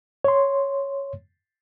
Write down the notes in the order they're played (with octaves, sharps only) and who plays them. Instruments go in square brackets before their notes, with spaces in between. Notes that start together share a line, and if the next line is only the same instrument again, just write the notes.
[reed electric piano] C#5 C6